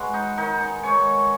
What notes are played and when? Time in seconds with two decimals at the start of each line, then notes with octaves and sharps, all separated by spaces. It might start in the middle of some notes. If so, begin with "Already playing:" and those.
Already playing: G#3 F#4 B4
0.14 D#4
0.37 D#3 D#4
0.60 D#4
0.83 G#3 D#4 C#5